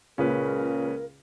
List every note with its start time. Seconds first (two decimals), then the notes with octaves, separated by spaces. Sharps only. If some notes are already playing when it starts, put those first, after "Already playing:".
0.18 C#2 A#2 C#3 C#4 A#4 B4